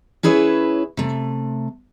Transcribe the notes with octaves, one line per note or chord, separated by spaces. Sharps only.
C#4 E4 G#4 B4 C#5 E5
C3 A3